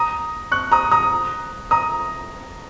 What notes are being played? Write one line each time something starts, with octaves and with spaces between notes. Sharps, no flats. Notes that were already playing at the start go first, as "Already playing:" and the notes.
Already playing: A#5 D#6
C#6 F#6
A#5 D#6
A#5 D#6
A#5 D#6